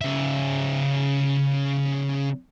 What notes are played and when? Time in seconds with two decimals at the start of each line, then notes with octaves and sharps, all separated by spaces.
0.01 C#3 E5